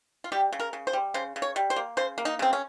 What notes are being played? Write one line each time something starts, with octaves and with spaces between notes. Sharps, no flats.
F4
G3 G4
C#3
A#4
C#3
C5
G3
C#3 C5
C#3
C#5
G3
C5
A#3
C#3 C5
A#3
D#4
C#3 C4
C#4